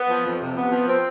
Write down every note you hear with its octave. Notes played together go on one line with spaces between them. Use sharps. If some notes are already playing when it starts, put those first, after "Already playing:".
Already playing: B3
F3
F2
C3
B3
F3
C4